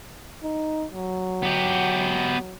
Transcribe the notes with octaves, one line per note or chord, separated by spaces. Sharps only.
D#4
F#3
B3 G4